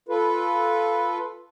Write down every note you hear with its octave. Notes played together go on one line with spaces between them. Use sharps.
F4 A4 B4